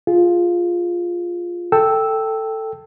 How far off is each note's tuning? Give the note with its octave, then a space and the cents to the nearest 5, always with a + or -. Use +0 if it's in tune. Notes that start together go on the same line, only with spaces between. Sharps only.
F4 +0 G#4 +0
A4 +10 G5 +0 E6 -5